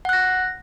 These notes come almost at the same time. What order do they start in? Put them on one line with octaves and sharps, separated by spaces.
F#5 F#6 A#6